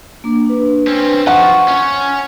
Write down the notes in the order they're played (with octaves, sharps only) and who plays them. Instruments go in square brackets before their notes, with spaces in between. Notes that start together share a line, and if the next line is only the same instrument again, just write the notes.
[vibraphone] A#3 D4
D4 B4
[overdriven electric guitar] C4 C#4
[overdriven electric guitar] F3 [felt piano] F#5 [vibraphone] C#6
[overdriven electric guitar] C#4 C#5